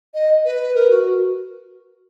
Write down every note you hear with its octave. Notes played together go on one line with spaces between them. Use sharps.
D#5
B4
A#4
F#4